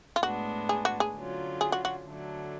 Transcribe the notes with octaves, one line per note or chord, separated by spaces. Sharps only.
F4
A2 G#3 B3 D4 F#4
G#4
F#4
G#4
D3 F#3 C#4 F4
G#4
F#4
F#4
D3 F#3 A3